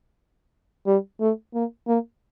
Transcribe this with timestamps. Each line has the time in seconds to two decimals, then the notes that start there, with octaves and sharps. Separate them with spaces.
0.87 G3
1.21 A3
1.54 A#3
1.87 A#3